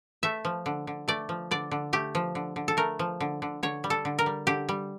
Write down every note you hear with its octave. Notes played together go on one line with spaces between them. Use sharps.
A3 E5
F3
D3
D3
A3 D5
F3
D3 D5
D3
A3 G4
F3
D3
D3
A4
A3 A#4
F3
D3
D3
D3 C#5
G3
A4
D3
A#4
G3
D3 G4
G3